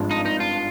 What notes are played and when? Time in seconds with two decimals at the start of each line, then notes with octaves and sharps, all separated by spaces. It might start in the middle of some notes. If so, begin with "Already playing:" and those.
Already playing: G#1 G2 F3 G#3 D4
0.11 D#4
0.26 D#4
0.40 F4